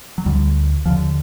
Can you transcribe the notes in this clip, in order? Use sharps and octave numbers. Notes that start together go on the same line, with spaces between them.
F#3
D2 D3 G3
D#2 D3 F3